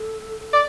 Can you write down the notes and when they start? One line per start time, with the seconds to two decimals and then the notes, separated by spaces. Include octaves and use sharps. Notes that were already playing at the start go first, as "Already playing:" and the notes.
Already playing: A4
0.53 D5